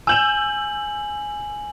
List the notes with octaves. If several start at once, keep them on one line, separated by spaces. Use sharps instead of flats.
G#5 E6 G6 E7 F#7